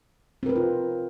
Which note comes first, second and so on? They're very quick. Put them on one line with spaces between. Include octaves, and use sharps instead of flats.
C4 A#4 B4 D#4 F4